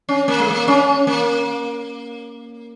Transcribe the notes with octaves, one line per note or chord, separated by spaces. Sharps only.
C#4
A#3
G#3
A#3
C#4
A#3